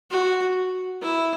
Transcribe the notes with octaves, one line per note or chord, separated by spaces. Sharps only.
F#4
E4